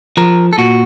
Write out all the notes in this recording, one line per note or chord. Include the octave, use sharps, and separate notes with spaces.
F3 A#4
A4
A#2 F#4